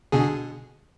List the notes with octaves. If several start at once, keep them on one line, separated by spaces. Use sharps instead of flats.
B2 D3 G#4